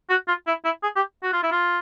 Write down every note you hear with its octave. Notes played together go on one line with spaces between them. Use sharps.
F#4
F4
E4
E4
G#4
G4
F#4
F4
E4
F4